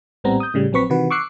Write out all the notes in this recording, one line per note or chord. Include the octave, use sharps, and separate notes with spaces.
A#1 A2 G3 B3 C4 A#5
D#6 G6
A2 C#3 G3
A#1 F#3 C4 B4 C#6 B6
C3 D#3 E3 F#4 B4
C#6 D6 E6 F#6 C7 C#7